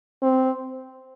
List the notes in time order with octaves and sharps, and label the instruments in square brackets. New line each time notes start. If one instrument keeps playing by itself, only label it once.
[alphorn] C4